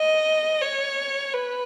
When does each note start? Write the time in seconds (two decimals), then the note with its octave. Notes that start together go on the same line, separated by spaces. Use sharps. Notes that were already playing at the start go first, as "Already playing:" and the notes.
Already playing: D#5
0.62 C#5
1.34 B4